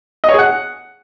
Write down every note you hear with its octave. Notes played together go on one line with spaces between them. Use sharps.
D#5
C#5
G#4
F#5